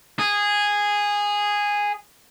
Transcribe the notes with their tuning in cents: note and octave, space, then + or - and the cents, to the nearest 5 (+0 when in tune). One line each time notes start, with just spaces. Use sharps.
G#4 -10